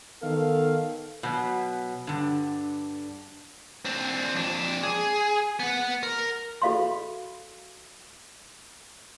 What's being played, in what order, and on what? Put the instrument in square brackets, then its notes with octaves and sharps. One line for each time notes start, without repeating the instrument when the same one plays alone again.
[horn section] D#3 B3 A4 F5
[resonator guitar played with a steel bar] B2 F#3
G2 D3
[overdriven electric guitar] C4 D4
F2 D4
G#4
B3 F#5
A#4
[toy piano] F#4 A4 E5 F5 B5 C6